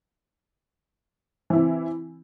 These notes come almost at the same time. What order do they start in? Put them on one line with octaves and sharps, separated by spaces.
E3 E4 C4